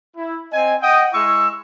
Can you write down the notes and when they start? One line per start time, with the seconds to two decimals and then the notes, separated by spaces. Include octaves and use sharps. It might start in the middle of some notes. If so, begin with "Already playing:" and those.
0.17 E4
0.52 C4 D#5 G#5
0.82 D#5 F#5 G5 D#6
1.14 G#3 E4 C#6 E6